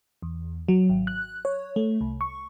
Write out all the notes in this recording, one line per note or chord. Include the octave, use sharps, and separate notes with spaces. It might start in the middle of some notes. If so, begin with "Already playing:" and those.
E2
F#3
G#1
F#6
C#5
A3
C2
C#6